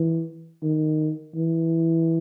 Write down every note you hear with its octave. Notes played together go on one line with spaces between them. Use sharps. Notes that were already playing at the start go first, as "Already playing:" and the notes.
Already playing: E3
D#3
E3